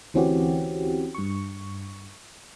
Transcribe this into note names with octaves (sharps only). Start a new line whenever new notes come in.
D2 E3 C4 C#4 F#4 G4
G2 C#6